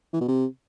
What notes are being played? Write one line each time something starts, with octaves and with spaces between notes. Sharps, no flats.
E3
B2
C3